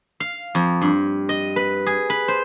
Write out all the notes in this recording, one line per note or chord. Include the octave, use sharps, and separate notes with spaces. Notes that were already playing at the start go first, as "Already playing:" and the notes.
F5
F2
G2
D#5
B4
G#4
B4
C5